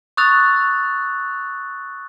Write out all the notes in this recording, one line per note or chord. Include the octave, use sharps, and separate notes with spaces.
C#6 D#6 E6 F#6 A6 F7